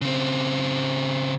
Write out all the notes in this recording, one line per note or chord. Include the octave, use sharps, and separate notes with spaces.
C#3 C4